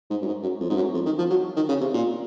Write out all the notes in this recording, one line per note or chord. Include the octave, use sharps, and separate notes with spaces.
G#2
F#2
G#2
F#2
F2
G#2
F#2
F2
D#3
F3
F#3
D#3
C#3
C3
A#2